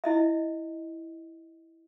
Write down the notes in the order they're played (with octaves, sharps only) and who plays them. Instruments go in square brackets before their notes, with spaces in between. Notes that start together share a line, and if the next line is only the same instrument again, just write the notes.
[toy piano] E4 D#5 E5